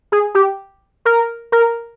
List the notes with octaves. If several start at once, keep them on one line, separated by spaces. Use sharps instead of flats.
G#4
G4
A#4
A#4